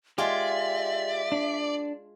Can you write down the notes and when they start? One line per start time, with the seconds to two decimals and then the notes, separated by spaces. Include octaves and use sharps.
0.18 G#3 F4 G4 D5 E5
1.32 D4